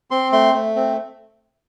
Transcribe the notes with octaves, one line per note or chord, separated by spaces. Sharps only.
C4 C6
A3 C6
A3
C4